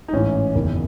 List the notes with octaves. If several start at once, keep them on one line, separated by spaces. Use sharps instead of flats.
D#4
A1 G#2 E3 C#4
F#1 E2 D#3